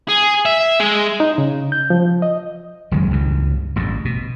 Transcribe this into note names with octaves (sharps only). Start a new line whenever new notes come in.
G#4
E5
G#3
D#4
C#3
G6
F3
D#5
F#1 F#2 D#3 G#3
C#2 G2 E3
A1 E2 G2
B2